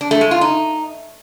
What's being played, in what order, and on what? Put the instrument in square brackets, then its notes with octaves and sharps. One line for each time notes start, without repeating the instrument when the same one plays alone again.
[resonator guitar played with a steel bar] D4
A3
G#3
F4
D#4